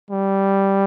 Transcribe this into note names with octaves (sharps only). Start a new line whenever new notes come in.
G3